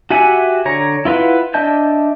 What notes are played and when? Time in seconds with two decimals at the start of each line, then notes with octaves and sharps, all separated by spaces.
0.10 F#4 G4 E5 F#5 G#5
0.65 D3 C#5 A#5
1.05 E4 F4 B4 F#5
1.54 D4 D#5 E5 A5 G6